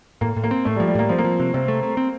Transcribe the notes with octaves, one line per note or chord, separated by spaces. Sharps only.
A2 A#3
A2
A#3
C4
A2 A3
G3
F3
G3
A2 A#3
F3 C4
A#3
F3
C3
C3 C4
A3
A3
C4